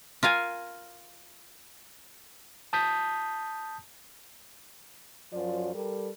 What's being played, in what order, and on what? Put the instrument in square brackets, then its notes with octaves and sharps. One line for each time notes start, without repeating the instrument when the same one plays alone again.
[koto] F4 A#4 F5 G#5
[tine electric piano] A5 D#6 G6 B6
[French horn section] F#2 F3 F#3 F4 C5 D5
G3 A4 A#4